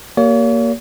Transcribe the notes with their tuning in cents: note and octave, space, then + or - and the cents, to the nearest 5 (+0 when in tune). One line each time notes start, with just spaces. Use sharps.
A#3 +0 G4 -10 C#5 +45